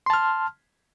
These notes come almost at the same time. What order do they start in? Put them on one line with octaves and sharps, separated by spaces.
C6 A5 F6